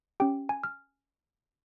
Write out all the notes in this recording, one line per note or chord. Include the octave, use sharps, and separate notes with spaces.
C#4 G4 G5
G#5
F6